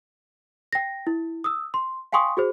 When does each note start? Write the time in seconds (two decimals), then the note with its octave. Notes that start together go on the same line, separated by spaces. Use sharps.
0.73 G5 A#6
1.07 E4
1.44 D#6 E6
1.74 C6
2.12 F5 G5 G#5 C6 C#6 D#6
2.37 F#4 G#4 C5